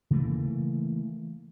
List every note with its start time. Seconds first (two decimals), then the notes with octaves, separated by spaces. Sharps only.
0.10 C#3 E3 A3 A#3